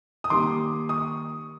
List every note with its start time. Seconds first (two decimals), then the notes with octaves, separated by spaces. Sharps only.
0.24 D#6
0.30 D#3 G3 A#3 C6 D6
0.89 C#6 D#6